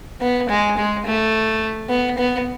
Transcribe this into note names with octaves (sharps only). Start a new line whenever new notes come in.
B3
G#3
G#3
A3
B3
B3